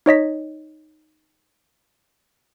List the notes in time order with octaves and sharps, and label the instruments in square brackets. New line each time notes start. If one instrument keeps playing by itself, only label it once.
[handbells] D#4 C#5 D#5 B6